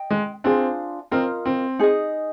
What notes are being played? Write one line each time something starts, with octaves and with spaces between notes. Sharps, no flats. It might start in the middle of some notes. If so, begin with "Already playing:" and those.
Already playing: D#5 G5
G#3
C4 D4 F4 G#4 C5
C4 F4 A#4 D#5
C4
D#4 G#4 D#5